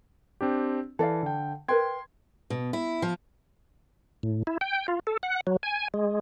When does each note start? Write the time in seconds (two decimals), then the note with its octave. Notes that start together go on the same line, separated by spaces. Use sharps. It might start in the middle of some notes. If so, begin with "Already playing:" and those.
0.41 C4 D4 G4
0.99 E3 A4 D5 F5
1.23 D3 G5
1.68 A#4 B4 G5 C6 G#6
2.50 B2
2.73 E4
3.02 F3
4.23 A2
4.47 E4
4.61 G5
4.88 F4
5.07 A4
5.23 F#5
5.47 F#3
5.63 G#5
5.94 G#3